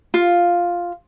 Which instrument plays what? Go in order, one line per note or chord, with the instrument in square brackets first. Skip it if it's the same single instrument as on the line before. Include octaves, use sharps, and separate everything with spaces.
[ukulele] F4